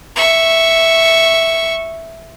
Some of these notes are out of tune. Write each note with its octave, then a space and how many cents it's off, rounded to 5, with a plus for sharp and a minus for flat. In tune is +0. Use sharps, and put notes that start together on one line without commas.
E5 +0 C#6 +0